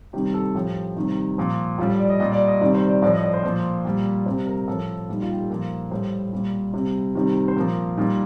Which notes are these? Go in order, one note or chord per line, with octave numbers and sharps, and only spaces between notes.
C3 D#3 G3 G4
A4
A2 F3 G4
C3 D#3 G3
A#2 F3
A2 G3 F4
D5
D#5
A#2 G3 D#5
D5
D#5
C3 D#3 G3 D5
C5
D5
A2 F3 D5
D#5
D5
C5
A#2 F3
A#2 G3
C3 G3 C5
A#4
A2 F3 A4
A#2 G3 D#4
F4
G4
A4
A#2 F3 A#4
A2 G3 C5
A#2 G3
C3 G3
C3 D#3 G3
C5
A#2 F3 A#4
A#2 G3 D#4